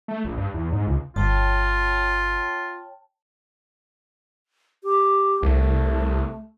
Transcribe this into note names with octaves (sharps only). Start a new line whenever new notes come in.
A3
A#1
G2
E2
G#2
C#2
G1 F4 C#5 G5 A5
G4
C2 A3